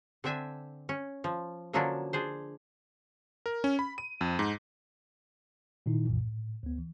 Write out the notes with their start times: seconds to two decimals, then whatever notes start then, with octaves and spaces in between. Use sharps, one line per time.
0.24 D3 C4 D4 E5 G#5
0.89 C#4
1.24 F3
1.73 D3 F3 F#3 A#3 C#4 D4
2.13 D4 G#4 C5
3.46 A#4
3.64 C#4
3.79 B5
3.98 D#7
4.21 F2
4.39 G#2
5.86 A#2 D#3 D#4 E4
6.06 C2 F#2 A#2 E3
6.21 A2
6.63 D2 B3
6.79 E3